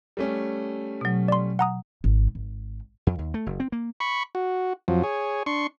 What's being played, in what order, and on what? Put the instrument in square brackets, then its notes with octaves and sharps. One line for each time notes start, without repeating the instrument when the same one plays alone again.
[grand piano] G3 A3 C#4
[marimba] B2 F#3
[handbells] D5 C6
F#5 A#5 D#6
[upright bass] G#1
G#1
[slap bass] F2
D#2
A3
F#1
C4
A#3
[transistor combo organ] B5 C#6
F#4
F2 F3 F#3
G#4 C#5
D4 C6 C#6